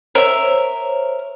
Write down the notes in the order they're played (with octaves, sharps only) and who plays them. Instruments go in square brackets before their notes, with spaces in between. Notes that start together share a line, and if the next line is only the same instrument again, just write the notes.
[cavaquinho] A#4 E5 [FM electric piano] C5 C#5